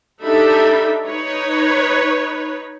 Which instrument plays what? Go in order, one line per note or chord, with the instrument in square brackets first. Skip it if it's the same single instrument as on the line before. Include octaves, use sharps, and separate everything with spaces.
[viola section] D4 D#4 G4 A4 E5 B5
D#4 B4 C#5